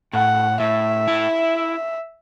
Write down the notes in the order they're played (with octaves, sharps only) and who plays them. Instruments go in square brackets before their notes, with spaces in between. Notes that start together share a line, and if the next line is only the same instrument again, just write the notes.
[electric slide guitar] A2 [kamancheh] F#5
[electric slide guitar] A2 [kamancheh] E5
[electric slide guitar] E4